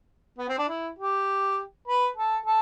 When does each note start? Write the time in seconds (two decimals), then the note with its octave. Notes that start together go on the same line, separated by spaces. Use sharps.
0.38 B3
0.49 C4
0.58 D4
0.69 E4
0.99 G4
1.88 B4
2.17 A4
2.46 A4